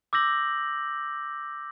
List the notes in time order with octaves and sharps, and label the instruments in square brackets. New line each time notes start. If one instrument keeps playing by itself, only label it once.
[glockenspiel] D6 E6 G6 A#6 F#7